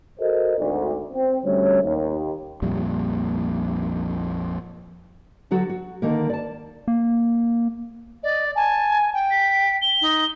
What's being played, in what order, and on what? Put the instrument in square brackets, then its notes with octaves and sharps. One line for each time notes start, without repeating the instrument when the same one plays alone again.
[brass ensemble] F#4 A4 A#4 C5 D#5
G#1 D2
C4
D2 G3 A3 C#4 C#5
D#2
[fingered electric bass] A#1 F2 A#2 G3
[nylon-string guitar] D3 F#3 F#4 A4
F#4
D3 D#3 A#3 A#4
D5 A5
[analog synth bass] A#3
[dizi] D5 [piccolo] D#5
[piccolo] G#5 [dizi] A5
[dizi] G5
[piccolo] B6
G7
[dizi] D#4